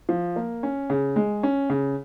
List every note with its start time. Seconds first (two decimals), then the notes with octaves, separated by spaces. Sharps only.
0.09 F3
0.36 A#3
0.63 C#4
0.90 C#3
1.16 G#3
1.43 C#4
1.70 C#3